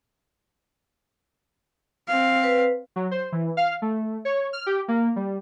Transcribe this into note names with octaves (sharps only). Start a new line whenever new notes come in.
C4 F5
B4
F#3
C5
E3
F5
A3
C#5
F6
G4
A#3
G3